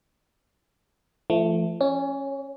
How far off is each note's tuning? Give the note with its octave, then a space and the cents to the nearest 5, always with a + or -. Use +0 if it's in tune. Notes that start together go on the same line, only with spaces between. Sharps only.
F3 -35 A3 +0
C#4 -10 C#5 +35